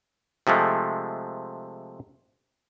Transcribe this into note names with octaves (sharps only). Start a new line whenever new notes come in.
C3 F3 G#3 A3